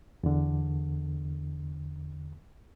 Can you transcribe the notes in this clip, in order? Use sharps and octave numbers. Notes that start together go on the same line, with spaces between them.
E2 D3